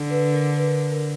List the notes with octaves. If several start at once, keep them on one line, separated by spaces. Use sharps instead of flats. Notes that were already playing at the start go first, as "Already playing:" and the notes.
Already playing: D3
B4
A#4
B4
A#4
A#4